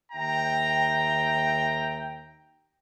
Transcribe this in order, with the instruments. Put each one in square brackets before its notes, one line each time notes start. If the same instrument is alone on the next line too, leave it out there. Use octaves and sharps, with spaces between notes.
[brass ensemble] D#2 E5 G5 [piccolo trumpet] A#5